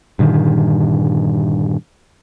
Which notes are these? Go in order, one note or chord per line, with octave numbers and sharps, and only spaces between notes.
G2 A#2 D3 D#3